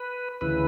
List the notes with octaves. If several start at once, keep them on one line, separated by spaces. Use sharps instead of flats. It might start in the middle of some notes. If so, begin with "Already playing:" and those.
Already playing: B4
D2 C#3 E3 B4